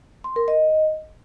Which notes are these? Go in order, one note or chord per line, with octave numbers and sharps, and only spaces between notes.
C6
A#4
D#5